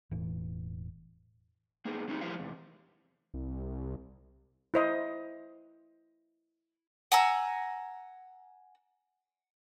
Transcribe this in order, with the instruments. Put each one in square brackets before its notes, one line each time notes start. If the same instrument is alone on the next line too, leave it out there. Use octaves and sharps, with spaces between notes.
[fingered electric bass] E1 A2 E3
[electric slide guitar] A#3 B3 D#4 G#4
F#3 A#3 C4 D#4 F#4 G4
E2 F3 E4 G4 C5 F5
E2 C3
[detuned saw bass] C2
[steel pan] E4 C5 D#5
[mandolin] F#5 G#5 A#5 E6